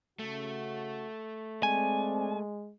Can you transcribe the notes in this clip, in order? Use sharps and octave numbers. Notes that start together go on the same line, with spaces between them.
C#3 A3 F#4
G#3 C4 D5 G#5